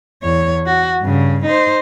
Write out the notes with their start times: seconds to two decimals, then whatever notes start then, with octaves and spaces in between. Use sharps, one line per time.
0.23 E2 C#5
0.66 F#4
1.02 G2 C#3
1.46 D#4 C5